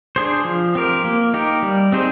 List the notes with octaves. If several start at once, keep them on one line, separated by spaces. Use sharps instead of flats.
D4 G#4 C5
F3
C4 G4 A#4
A#3
D#4 G4 A#4
G3
C4 D#4 G#4 C5